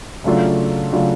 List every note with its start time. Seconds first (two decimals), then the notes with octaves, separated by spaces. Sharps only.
0.24 C#3 F#3 A3 D4 F4
0.92 C#3 F#3 A3 D4 F4